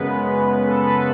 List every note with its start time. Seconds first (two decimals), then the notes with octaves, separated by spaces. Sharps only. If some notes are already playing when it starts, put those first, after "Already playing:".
Already playing: F#2 C#3 G#3 B3 B4
0.67 A4
0.87 B4